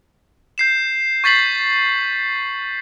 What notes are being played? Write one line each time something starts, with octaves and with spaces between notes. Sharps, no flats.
G6 C7 E7
C#6 G6 A6 B6 C7 F#7